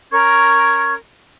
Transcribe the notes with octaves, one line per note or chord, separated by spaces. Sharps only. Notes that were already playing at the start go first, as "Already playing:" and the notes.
C#4 A#4 C#6 G#6